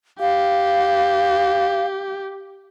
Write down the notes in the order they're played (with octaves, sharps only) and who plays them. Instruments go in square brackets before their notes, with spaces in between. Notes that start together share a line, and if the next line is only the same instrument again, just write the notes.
[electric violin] G4 [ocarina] F5